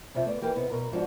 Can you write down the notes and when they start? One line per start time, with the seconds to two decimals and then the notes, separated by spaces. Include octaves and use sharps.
0.15 F2 C3 F3 E5
0.26 A3 B3 D5
0.42 E3 A#3 G4 A#4 B4
0.55 C3 B3 D#4
0.70 B2 A#4 C#5 A#5
0.92 G#2 F3 D4 F#4